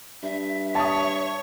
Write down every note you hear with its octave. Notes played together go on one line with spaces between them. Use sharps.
G2 E5
C#5 A5 D#6